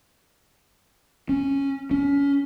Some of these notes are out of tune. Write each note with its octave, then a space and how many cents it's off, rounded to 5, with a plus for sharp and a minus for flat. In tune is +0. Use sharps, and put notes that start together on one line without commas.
C#4 -5
C#4 +25